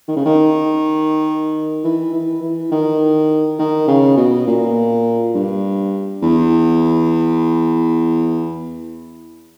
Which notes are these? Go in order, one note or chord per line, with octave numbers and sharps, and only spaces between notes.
D#3
C#3
D#3
E3
E3
E3
D#3
D#3
C#3
B2
A#2
G2
E2